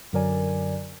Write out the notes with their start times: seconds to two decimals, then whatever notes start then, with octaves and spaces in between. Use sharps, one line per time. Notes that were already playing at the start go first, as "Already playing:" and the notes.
0.13 F#2 D3 F#3 A#4 D5 G#5